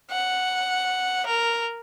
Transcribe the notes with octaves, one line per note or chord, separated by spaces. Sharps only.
F#5
A#4